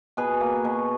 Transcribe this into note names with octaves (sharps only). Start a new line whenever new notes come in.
B2 G#4 B4
A#3
B2